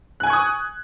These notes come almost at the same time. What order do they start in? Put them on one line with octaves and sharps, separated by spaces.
F#6 G#5 G#6 C#6 D#6